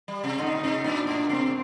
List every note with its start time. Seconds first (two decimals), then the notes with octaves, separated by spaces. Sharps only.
0.08 G3
0.24 C3
0.38 D3 D#4
0.47 C3
0.55 A#2
0.63 C3
0.84 A#2 D4
1.07 A2
1.29 C3 C4